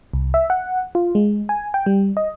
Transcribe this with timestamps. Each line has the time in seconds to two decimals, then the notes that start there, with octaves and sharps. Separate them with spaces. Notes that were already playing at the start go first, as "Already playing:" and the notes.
0.13 C2
0.34 E5
0.50 F#5
0.95 F4
1.15 G#3
1.49 G#5
1.74 G5
1.86 G3
2.17 D#5